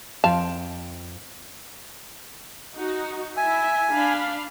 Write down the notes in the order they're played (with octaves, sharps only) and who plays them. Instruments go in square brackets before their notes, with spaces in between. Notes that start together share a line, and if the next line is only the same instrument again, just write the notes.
[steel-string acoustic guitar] F2 G5 [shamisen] F3 F5 A5
[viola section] D#4 F#4
[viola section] E4 E5 [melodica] G#5
[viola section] D4 F5 B5